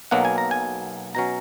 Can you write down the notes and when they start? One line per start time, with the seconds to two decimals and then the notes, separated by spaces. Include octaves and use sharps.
0.11 B1 B2 F#3 A#3 F#5
0.25 G#5
0.38 A#5
0.51 G#5
1.15 B2 F#3 C#4 A#5